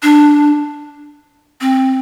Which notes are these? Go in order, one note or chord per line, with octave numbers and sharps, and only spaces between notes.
D4
C4